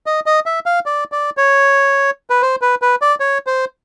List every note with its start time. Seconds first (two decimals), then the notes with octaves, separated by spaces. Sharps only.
0.06 D#5
0.26 D#5
0.46 E5
0.66 F5
0.86 D5
1.12 D5
1.37 C#5
2.30 B4
2.42 C5
2.61 B4
2.82 B4
3.02 D5
3.20 C#5
3.47 C5